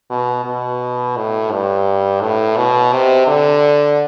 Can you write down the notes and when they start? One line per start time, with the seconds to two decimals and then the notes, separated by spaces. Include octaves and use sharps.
0.10 B2
0.45 B2
1.16 A2
1.51 G2
2.21 A2
2.57 B2
2.93 C3
3.27 D3